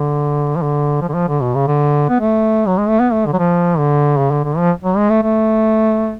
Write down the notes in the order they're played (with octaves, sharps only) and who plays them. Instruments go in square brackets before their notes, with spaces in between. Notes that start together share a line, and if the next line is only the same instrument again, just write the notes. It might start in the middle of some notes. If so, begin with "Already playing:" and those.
Already playing: [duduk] D3
F3
D3
F3
D3
F3
D3
B2
C#3
D3
B3
A3
F#3
G#3
A3
B3
A3
D3
F#3
F3
D3
C#3
D3
D3
F3
F#3
G#3
A3
A3